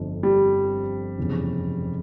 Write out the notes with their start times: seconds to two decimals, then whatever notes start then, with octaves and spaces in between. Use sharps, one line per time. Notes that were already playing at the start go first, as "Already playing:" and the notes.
Already playing: G1 F2 D3 F3
0.23 G3
1.18 F1 E2 C#3